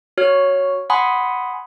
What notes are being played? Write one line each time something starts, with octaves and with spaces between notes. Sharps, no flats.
F#4 C#5 F6
F#5 G#5 B5 C6 D#6